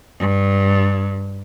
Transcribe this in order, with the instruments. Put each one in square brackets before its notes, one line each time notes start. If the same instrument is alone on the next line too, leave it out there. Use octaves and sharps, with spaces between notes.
[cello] G2